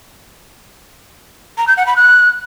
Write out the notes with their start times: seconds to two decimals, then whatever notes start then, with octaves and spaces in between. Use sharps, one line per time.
1.58 A#5
1.67 G6
1.77 F#5
1.87 B5
1.96 F#6